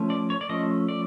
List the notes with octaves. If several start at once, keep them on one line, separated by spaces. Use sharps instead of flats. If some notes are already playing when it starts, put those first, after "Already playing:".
Already playing: F3 A3 C#4
D5
C#5
D5
F3 A3 C#4 D#5
D5